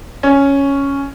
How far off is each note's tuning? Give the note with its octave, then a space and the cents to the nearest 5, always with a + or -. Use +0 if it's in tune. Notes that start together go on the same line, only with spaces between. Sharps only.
C#4 +0